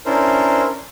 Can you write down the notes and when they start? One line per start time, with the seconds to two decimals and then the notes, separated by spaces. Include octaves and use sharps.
0.06 C#4 D4 E4 A#4 C5